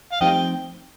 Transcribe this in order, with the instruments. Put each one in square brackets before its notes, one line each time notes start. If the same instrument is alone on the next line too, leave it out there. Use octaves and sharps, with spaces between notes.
[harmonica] F5
[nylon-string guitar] F3 A3 C4 D#4 G4 [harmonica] D#5 G5